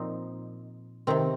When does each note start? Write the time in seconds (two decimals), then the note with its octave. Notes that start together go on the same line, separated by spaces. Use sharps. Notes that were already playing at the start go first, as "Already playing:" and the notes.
Already playing: A#2 F3 C4 D#4
1.07 C3 D#3 C4